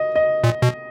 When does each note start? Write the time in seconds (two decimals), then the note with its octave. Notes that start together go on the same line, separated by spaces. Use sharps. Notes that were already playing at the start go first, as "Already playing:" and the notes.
Already playing: D#5
0.15 D#5
0.44 A#2
0.62 B2